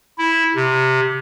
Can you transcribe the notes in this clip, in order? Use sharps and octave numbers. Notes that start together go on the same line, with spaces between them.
E4
C3